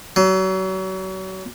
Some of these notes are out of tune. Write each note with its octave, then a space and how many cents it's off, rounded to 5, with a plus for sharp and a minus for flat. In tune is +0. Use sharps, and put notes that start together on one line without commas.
F#3 +35